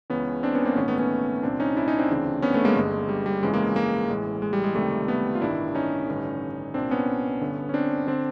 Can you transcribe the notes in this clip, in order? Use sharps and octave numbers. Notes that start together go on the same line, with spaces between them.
C#2 C#3 E3 B3 C#4
C4 D4
B3 C#4
A#3 C4
A#1 G#2 D#3 B3 C#4
A3 B3
B3 C#4
C2 A#2 C4 D4
C#4 D#4
D4 E4
C#4 D#4
C4 D4
D2 C#3 E3
B3 C#4
A3 B3
G#3 A#3
G1 G2 D3 G#3
G3
G3
G1 F2 C#3 E3 G#3
G#3 A#3
G#3 A#3
A1 A2 E3 G#3
G#3
G3
G#3
C#2 C3 D#3 G3 A3
A3 B3
F4
A1 G2 D#3 D4 E4
C#4 D#4
A1 G2 D3
C2 A#2 C4 D4
B3 C#4
G1 G2 D3
C#4
C4 D4
D3 C4 D4